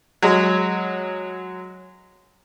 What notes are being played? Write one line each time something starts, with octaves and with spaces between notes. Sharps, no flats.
F#3 G#3